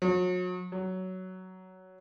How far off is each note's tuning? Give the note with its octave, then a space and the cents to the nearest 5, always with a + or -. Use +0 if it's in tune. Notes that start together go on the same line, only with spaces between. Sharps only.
F#3 -35
F#3 +10